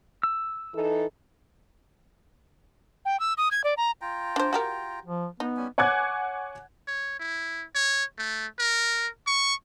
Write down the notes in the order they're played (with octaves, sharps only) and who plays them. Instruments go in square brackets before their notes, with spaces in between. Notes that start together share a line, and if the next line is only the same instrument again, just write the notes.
[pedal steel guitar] E6
[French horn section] E3 D#4 A4
[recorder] G5
E6
D#6
G#6
D5
A#5
[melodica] F4 G5 A#5
[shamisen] D4 C5
F#4 G4 A#4
[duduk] F3
[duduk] B3 [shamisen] D#4
[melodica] G3 C#4 G#5
[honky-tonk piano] C#5 F#5 G#5 D6 F#6 G#6
[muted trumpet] C#5
E4
C#5
A3
A#4
C#6